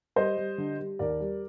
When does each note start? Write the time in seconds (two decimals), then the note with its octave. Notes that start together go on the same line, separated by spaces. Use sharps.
0.16 G3 C5 D#5
0.37 G3
0.58 D3
0.79 G3
0.99 D#2 A#4 D5
1.20 G3